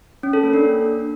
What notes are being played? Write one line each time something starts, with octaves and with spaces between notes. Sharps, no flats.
C#4
A4
A#3
D4